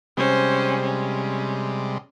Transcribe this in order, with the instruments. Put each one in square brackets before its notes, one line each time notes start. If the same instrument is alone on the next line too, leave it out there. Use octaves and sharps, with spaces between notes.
[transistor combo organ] C3 G3 G#3 [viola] C#4 C5
[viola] C#4